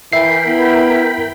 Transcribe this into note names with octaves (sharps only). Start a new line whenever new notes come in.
E3 A#4 E5 G5 B5 C7
B3 E4